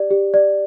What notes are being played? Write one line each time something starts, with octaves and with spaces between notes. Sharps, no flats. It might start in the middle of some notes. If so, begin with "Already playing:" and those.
Already playing: G4 D5
G4
D5